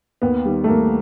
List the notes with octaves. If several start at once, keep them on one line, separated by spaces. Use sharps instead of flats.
D#2 B3
D#3 G3
A3
D#2 A#3